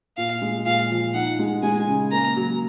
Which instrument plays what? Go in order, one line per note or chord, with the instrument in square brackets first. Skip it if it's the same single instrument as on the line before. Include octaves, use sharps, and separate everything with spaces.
[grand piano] A#2 [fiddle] F5
[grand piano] G#3
[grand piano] A#2 [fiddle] F5
[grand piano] F3
[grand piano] D#4 [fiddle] F#5
[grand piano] G#3
[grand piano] G#3 [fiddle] G#5
[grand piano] C#3
[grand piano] A#3 [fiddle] A#5
[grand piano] F#3